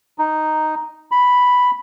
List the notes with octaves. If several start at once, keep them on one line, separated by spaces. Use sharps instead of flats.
D#4
B5